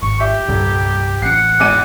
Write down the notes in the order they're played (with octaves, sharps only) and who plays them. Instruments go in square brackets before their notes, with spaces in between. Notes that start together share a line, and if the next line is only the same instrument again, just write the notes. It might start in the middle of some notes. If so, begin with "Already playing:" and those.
[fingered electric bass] G#1 [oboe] C#6
[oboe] G4 [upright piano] E5
[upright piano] D#1 [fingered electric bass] C2 G2 A#2
[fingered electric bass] A1 C#4 [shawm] F#5 [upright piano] C7 C#7
[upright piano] G#1 E2 D#7 [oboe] D6